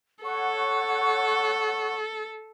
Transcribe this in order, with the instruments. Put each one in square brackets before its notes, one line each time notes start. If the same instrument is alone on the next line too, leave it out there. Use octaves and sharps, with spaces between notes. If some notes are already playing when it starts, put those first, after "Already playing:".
[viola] A4 [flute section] C#5 F#5 C#6